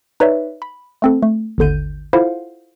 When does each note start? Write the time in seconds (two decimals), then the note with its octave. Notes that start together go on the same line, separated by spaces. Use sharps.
0.20 D#4 B4 C#5 D5 E5
0.62 B5
1.02 A3 C4 A4
1.22 A3
1.58 G#1 D#2 D3 G6 D#7
2.13 E4 F4 A4 C5 F5 F#5